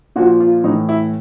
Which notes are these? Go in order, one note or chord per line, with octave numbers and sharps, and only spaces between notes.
A#2 F3 F#4
F4
A2 E3 D#4
E4